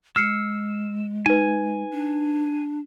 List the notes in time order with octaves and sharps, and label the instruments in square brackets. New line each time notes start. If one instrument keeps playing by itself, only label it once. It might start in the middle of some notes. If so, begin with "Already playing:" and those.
[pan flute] G#3 [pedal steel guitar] E6 [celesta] F6 C7 C#7
[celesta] D#4 B4 [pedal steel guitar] G#5
[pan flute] D4